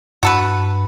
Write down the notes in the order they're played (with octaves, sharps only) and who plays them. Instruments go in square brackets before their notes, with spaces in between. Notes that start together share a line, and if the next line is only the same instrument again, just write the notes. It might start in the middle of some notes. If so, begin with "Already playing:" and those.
[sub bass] G2 [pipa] F#4 A4 B4